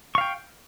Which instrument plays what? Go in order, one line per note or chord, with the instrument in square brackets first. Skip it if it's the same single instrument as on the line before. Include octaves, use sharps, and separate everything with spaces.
[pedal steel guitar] C#6
F5
G5